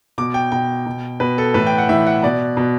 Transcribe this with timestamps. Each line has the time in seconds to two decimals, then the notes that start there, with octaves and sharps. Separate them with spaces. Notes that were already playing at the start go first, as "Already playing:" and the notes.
0.18 B2 D6
0.34 G5
0.52 B2 G5
0.86 B2
1.20 B2 B4
1.38 A4
1.54 A2 E3 B4
1.67 G5
1.78 F#5
1.89 A2 E3 E5
2.07 F#5
2.23 B2 D5
2.57 B2